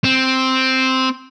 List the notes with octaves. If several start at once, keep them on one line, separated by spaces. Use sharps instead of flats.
C4